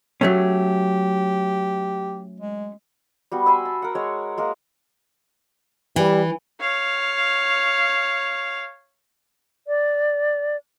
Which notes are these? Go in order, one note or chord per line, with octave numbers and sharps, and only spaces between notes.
F#3 A3 C#4 G4
G#3
G3 B3 F#4
E5 G#5 B5 C6
A5
A#4 F#5
G#3 C#5 F#5
G#3 A#3 A#4
E3 G3
C#5 F5
D5